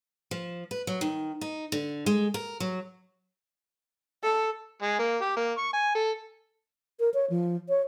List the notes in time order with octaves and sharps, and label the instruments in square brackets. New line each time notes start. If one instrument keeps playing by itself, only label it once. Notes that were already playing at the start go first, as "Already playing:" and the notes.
[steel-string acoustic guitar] F3
B4
F#3
D#3
D#4
D3
G#3
A#4
F#3
[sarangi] A4
[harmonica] G#3
A#3
G4
A#3
C#6
G#5
A4
[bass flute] A#4
C#5
F3
C#5